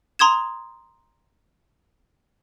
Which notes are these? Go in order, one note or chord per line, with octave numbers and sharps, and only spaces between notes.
A#5 C6 D#6 G#6 E7